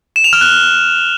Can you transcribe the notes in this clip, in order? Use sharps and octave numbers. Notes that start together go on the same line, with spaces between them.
E7
F7
F6
F#6